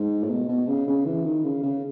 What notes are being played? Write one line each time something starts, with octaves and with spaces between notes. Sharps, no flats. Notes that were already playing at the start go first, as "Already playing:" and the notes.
Already playing: G#2
A2
B2
B2
C#3
C#3
E3
D#3
C#3
C#3